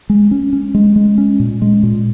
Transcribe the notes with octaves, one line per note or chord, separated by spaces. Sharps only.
G#3
C#4
C#4
G#3
G#3
C#4
A#2
G#3
A#2